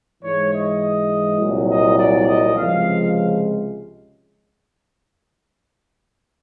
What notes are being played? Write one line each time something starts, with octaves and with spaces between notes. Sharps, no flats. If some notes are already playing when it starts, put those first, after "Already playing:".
G#2 E3 G#3 C#5
D#5
C2 A#2 F#3
D#5
D5
D#5
C#2 C3 F3 G#3 F5